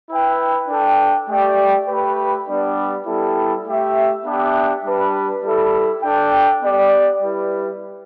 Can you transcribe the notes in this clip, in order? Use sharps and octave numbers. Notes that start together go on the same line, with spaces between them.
E4 B4 G5
D4 A4 G5
A3 G4 D5 G5
A3 G4 B4
G3 B3 D4 G4 D5
G3 B3 E4 A4 G5
A3 G4 E5
B3 D4 G4 E5
G3 D4 B4
G3 E4 A4 E5
D4 A4 G5
B3 G4 D5 G5
G3 E4 B4